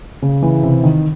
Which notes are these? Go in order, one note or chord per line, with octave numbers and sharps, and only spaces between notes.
C#3
E3
C3
D#3